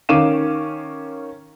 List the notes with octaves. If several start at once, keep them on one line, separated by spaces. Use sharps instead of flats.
D#3 C#4 F5 D6 D#7 E7